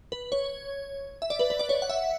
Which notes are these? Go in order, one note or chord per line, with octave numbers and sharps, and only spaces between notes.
B4
C#5
E5
D5
B4
B4
D5
C#5
F#5
E5